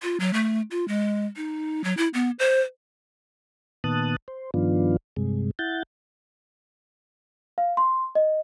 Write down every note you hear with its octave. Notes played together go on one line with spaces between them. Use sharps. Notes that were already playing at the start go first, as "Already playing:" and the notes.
F4
F#3
A3
F4
G#3
D#4
F#3
E4
B3
C5
A#2 D#3 B3 A5 D#6 F#6
C5
G2 D#3 F3 B3 D4 F4
G2 C3 G#3
E4 F#5 G6 A6
F5
C6
D#5